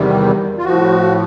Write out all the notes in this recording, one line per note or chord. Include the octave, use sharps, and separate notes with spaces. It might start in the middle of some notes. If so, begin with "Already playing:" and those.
Already playing: E2 C3 D#3 G3
F4
A2 F3 F#4